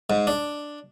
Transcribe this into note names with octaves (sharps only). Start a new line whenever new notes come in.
G#2
D4